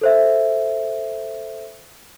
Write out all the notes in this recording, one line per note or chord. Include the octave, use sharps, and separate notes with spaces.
A4 C5 E5